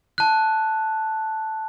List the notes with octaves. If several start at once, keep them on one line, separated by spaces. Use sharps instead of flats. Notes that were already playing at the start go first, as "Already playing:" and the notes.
A5 F#6